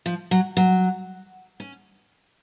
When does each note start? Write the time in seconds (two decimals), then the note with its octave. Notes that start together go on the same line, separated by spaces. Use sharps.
0.06 F3
0.31 F#3
0.57 F#3
1.60 C#4